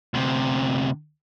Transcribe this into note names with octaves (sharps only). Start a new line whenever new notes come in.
D2 C3